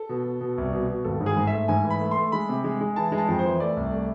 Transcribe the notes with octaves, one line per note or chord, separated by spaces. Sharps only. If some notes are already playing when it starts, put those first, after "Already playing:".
Already playing: A4
B2
B2
B2
C2
B2
B2
G#1 A4
G#2
G#4
G#2
E5
A3
G#2 G#5
E3
B5
A3
C6
A3
G#3 B5
C3
G#3
G#3
E3 A5
G#3
A5
F2
C5
E3
A3 D5
C2
A3